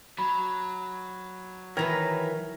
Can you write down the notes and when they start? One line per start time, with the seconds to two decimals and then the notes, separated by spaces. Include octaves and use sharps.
0.18 F#3 B5
1.77 D#3 E3 A#4 B4 C#5 G5 A#5